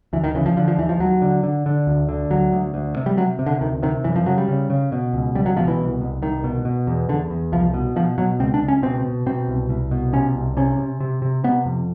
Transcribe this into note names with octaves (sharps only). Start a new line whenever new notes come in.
D2 E3
D#3
C#3 E3
F3
D3 F3
F3
D#2 E3
F3
D#2 F#3
D3
D3
D3
D2
D3
D2 F#3
D2
D2
C3
G3
C3 F#3
C3
D3
D2 D#3
C3 D#3
F#2 E3
F3
C#3 F#3
G3
C#3
C#3
B2
C#2
C#2 G3
F#3
B2 F3
E3
C2
C2
C2 D#3
B2
B2
E2
E2 D3
E2
C2 F3
B2
B2 F3
B2 F#3
C#2 C4
D4
C#2
C#4
B2 C4
B2
B2 C4
C2
C2
B2
C3 C#4
C2
C3 C#4
C3
C3
C3
C3 B3
F2